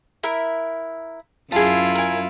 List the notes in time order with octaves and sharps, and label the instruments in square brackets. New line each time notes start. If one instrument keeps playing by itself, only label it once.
[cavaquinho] E4 A#4 E5
[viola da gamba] F#2 E4 F4 [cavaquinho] G#4 A5
[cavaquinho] A#4 G#5